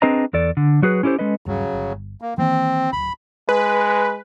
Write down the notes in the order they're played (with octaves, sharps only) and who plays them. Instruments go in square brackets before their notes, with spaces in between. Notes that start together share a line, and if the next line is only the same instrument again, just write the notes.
[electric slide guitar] C4 D4 G#4 B4 D#5 A#5
E2 A4 D5
D3
F#3 F#4 G#4 B4
C#4 E4 G4 A4 C5
G#3 C#4 A4 B4 D#5
[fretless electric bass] D#1 G2 [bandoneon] C#3 F#3
[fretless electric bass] G1
[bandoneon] A#3
[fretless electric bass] D#3 E3 A#3 [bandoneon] C4
[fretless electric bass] D1 G#1 [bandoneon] B5
[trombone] G#3 [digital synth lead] B4